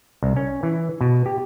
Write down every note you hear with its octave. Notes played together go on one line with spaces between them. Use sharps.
C2
C#4
E3
B2
G4